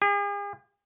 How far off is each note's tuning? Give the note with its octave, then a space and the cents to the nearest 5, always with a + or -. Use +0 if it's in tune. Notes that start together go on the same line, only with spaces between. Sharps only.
G#4 -45